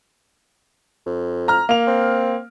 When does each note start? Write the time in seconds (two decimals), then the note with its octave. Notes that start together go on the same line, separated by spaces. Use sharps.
1.06 F2
1.48 A#5 F6
1.69 A#3 F7
1.87 C4